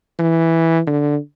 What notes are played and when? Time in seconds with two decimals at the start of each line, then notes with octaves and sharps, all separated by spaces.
0.19 E3
0.87 D3